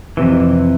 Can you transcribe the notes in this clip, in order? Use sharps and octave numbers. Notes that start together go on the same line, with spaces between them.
F2 C3 E3